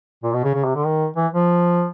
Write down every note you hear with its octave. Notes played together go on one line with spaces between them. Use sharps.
A#2
B2
C#3
C#3
C3
D3
D#3
E3
F3